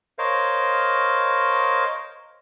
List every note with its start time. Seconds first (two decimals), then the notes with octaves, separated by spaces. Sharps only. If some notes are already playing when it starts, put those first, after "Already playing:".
0.19 A#4 C5 C#5 D#5 F5